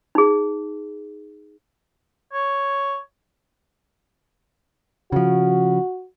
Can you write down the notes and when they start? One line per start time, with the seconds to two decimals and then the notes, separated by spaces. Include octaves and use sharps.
0.15 D#4 G#4
2.33 C#5
5.12 C#3 F3 F#4